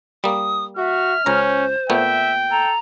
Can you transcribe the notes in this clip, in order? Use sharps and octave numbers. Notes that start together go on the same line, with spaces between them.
G3 A#3 D#6
F#4 E5 F6
C#2 C#4 C5 A#5
A#2 A3 B3 E5 G5
A4 A#5